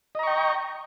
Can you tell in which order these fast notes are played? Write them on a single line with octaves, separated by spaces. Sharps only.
D#5 A#5 C#6 G5